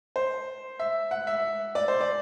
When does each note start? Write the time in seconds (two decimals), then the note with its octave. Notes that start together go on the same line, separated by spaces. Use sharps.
0.16 C5
0.79 E5
1.11 F#5
1.27 E5
1.75 D5
1.88 C5
2.01 D5